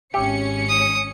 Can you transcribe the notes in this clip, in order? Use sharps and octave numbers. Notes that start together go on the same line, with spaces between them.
G#1 C#4 G4 E5 C#7
D#6